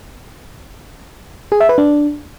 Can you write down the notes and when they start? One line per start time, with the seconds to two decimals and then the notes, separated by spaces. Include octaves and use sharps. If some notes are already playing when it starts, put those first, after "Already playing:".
1.52 G#4
1.60 E5
1.69 B4
1.78 D4